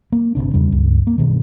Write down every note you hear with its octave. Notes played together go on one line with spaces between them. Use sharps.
A#3
G1 C#2 C3 D4
E2 C#3 G3
C#2 G2
A#3
G2 B2 D#3